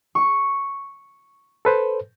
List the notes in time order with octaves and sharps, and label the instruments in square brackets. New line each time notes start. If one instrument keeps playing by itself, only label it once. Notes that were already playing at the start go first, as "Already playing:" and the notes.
[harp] C#6
[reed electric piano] A4 B4 C5